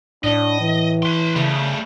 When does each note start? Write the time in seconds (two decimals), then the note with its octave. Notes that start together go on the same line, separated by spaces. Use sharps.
0.24 A2 D4 D#5
0.60 E3
1.03 B4 C6
1.36 C#3 G3 A3